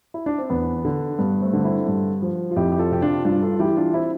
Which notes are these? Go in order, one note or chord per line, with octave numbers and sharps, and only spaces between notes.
E4
D4
C4
E2 B3
D3
G2 B3
A3 C4
D3
C4 E4
G2
F3
F4
F2 E4 G4
G4
F4 A4
C3 G4
D4 F4
G2 D4 F4
F4 A4
E3 E4 G4
D4 F4
C4 E4